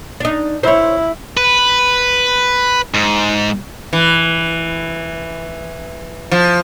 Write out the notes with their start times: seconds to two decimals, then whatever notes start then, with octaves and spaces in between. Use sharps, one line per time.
0.20 D4 D#4
0.63 E4 C5 C#5
1.37 B4
2.94 G#2
3.93 E3
6.31 F3